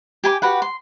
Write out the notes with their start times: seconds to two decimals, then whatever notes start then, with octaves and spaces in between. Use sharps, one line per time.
0.24 G4 G#5 B5 D6
0.42 F#4 G4 B4 F#5
0.62 C6